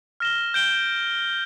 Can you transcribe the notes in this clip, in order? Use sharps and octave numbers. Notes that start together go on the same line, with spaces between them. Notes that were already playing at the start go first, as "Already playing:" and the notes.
F6 A#6 E7 G7
G6 D7 G7